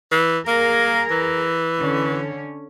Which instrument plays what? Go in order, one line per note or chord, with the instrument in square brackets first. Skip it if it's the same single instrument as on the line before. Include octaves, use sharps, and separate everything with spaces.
[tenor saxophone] E3
[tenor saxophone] A#3 [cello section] G#4 A#4
[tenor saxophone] E3
[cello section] D3 C#4